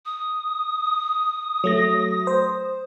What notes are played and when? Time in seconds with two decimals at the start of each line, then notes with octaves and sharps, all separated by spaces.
0.06 D#6
1.64 F#3 A3 A#6
2.27 C5